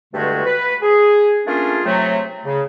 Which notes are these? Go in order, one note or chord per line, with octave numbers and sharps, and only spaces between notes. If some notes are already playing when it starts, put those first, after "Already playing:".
E2 G2 D3 G#3 A3 F#4
B4
G#4
A3 A#3 C#4 D4 F4 G#4
C3 F#3 A3
C#3